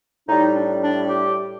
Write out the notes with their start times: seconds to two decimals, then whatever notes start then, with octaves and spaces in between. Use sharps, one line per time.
0.28 A2 G3 D#4
0.55 D4
0.82 D4
1.08 G4